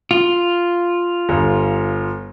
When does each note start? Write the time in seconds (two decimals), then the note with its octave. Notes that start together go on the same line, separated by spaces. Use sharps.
0.11 F4
1.29 G1